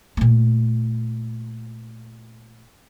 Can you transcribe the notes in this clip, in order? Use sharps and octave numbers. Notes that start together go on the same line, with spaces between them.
A#2 A3